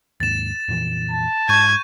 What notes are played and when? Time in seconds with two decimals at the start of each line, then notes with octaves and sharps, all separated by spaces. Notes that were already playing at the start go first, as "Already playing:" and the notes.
0.20 D#2 G#2 A6 E7
0.68 F2 A#2 E3
1.11 A5
1.49 G#2 C#6 G6 G#6 D#7